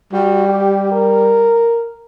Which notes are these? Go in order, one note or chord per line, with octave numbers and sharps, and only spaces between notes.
G3 F#4
G4
A#4